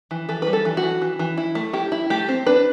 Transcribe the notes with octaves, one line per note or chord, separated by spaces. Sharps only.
E3
E3 A4
B4
G3
A4
E3
F#4
E3
E3
E3
E4
A3
E4 G4
E4
A3 G4
C4
D4 B4